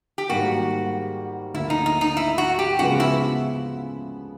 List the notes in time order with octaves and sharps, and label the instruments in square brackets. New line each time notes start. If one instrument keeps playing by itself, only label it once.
[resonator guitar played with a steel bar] G4
[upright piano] G#2 D#3 G3 A#3 [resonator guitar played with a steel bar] F#4
[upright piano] D2 D3 F3 A#3 [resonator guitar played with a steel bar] E4
[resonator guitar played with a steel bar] D#4
D#4
D#4
E4
F#4
G4
[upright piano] C#3 F3 G#3 B3 [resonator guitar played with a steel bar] F#4
[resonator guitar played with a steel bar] E4